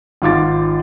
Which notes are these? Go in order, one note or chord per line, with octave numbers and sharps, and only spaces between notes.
G#1 F4 D6 A6